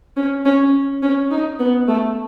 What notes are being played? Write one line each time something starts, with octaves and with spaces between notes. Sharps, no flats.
C#4
C#4
C#4
D#4
B3
A3